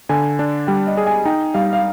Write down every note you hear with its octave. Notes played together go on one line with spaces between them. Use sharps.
D3 G#5
D4
G3 G5
D#5
G#4
G#5
D#4 G5
G3 F5
F5